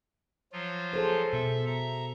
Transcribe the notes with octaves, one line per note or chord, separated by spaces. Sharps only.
F3 F#3 F4
G#4 A4 C5
B2 A4 E5
E5 A#5